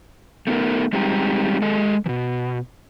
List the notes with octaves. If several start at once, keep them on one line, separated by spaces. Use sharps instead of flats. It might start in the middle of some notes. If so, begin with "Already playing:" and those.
A3 B3 D#4 A#4
G3 G#3 C4 D#4 G4 A#5
G#3 A4 D#5
B2 E3